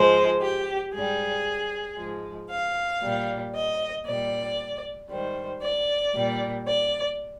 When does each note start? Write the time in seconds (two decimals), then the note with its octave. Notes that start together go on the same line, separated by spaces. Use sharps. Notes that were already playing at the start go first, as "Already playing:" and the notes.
Already playing: G#2 F3 G#3 C5
0.41 G4
0.93 G#2 G#4
0.98 G3
1.97 G#2 F3 G#3
2.49 F5
3.02 A#2 G3
3.54 D#5
4.06 A#2 G3 D5
5.09 G#2 D#3 G3 C5
5.62 D5
6.14 A#2 G3
6.66 D5